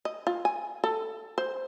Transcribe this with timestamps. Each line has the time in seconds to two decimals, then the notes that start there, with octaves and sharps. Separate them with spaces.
0.05 D#5
0.27 F4
0.45 G#5
0.84 A4
1.38 C5